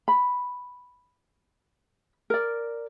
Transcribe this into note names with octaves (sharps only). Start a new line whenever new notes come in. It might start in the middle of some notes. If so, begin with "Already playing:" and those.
B5
A#4 D5